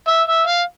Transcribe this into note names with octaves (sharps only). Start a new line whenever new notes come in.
E5
E5
F5